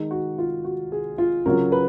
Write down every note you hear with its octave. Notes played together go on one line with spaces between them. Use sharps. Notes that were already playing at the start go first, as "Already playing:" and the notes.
Already playing: D#3 G#3 D#4
F#4
F4
F#4
G#4
F4
C#3 F#3 C#4 F4 A#4
B4